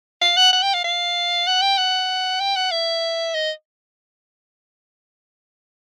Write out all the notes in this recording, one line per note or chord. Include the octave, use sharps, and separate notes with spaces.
F5
F#5
F#5
G5
F5
F5
F#5
G5
F#5
G5
F#5
E5
D#5